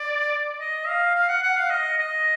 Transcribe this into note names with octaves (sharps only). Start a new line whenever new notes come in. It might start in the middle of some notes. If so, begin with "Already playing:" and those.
Already playing: D5
D#5
F5
F5
F#5
F#5
F5
D#5
D#5